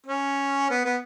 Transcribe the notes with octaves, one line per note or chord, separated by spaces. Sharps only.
C#4
B3
B3